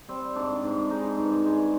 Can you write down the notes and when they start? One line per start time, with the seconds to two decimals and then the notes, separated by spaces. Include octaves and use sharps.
0.09 G3 C4
0.36 G#2 D4
0.63 G#2
0.90 G#3 D#4
1.17 G2
1.45 G#3